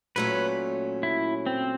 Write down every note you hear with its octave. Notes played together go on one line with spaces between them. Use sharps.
A#2 F#3 A3 C#4 B4
E4
C4